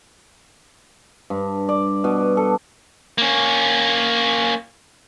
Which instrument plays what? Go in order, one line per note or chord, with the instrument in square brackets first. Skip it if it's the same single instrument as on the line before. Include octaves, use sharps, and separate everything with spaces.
[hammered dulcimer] G2
D5
B2
A4
[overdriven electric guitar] A#3 C#4